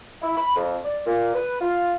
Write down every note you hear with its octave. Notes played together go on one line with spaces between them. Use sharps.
E4
B5
F2
D5
A#2
B4
F4